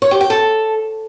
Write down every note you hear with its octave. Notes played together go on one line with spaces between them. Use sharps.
C#5
G4
G5
A4